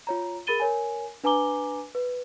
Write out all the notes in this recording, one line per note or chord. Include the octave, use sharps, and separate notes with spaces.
F4 C#5 A#5
G#4 A#4 B5 A6 D#7 G7
A#4 C#5 G#5
D4 B4 G#5 A#5 D6 G7
B4